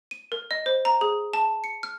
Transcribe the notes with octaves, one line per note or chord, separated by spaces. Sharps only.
D#7
A#4
D#5
C5
A#5
G#4
A5
C#7
F6